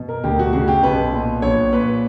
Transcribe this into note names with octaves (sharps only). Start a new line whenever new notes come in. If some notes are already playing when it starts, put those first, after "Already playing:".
Already playing: B2
A#4
D2 G4
F#4
C#3 F#4
G4
B1 B4
A#2
A#1 C#5
A#2 B4